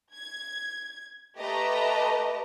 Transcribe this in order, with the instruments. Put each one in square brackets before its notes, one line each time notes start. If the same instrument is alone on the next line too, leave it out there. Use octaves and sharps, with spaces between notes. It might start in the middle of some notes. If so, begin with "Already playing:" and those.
[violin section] G#6
A3 G4 B4 D#5 A5 A#5